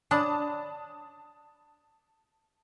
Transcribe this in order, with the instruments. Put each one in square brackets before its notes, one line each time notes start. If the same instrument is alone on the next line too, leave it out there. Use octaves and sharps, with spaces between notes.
[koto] D4 [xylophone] C#5 D5 B5 [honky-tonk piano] A5 D#6